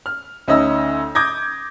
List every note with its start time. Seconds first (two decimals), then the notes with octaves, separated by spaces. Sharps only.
0.06 F6
0.48 D2 C#4 D#4 D#5 E6
1.15 D6 D#6 G6 G#6 A#6